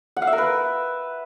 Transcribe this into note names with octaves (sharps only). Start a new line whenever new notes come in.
F#5
F5
E5
A#4
B4